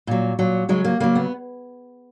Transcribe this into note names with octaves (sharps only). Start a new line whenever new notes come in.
A#2 F#3
A#2 F#3
C#3 F#3 G#3
A#3
C#3 F#3 A#3
B3